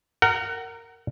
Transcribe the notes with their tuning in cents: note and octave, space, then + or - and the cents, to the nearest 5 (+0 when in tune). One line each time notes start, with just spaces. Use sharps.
A#4 -15 F#5 +25